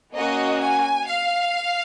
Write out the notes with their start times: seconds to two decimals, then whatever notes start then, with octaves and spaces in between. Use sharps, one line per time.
0.14 A#3 C#4 F#4 D#5
0.60 G#5
1.07 F5